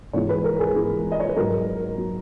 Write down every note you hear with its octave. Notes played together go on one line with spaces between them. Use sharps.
G#2 E3 G#3 C#5
B4
A#4
G#4
G#2 E3 G#3
D#5
C#5
B4
G#2 F#3 A#4
F#3